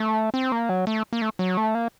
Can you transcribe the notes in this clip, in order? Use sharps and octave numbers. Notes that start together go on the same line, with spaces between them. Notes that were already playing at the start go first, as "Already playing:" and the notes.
Already playing: A3
C4
A#3
F#3
A3
A#3
A3
F#3
A3
A#3